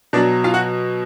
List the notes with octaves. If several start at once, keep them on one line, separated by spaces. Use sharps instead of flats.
B2 F#3 D4 D5
F4 F5
F#4 F#5